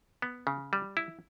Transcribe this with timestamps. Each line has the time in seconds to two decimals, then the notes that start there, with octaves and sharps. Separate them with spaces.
0.22 B3
0.47 C#3
0.73 G3
0.97 E4